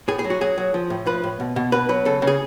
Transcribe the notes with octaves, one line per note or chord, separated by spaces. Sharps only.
A2 G#4
G#4
F#3
F#4
F#3 G#4
F#3
F3
A2
F3 B4
A2
B2
B2
B2 B4
F#3 B4
C#3 A4
C#3
G#4